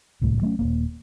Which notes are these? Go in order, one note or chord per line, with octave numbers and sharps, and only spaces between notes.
D1 C2 A2
F#3 A3 A#3 C#4
D#1 E2 A#3